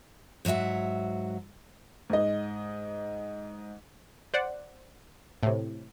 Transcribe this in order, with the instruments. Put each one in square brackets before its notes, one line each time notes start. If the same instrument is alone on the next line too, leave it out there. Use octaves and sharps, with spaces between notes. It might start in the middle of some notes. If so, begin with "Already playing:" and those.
[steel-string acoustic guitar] G#2 F#3 F4 E5 F#5
[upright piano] G#2 D#5
[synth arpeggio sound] C5 D5 F#5
A2 C3